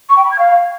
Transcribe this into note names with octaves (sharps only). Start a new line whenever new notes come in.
C#6
G5
B5
G#6
F5